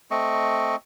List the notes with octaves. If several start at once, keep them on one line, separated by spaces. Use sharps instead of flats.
A3 C4 D#5 C#6